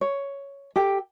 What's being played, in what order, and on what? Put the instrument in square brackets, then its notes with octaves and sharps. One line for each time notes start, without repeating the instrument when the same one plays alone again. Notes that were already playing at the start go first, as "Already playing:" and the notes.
[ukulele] C#5
G4 A4 G5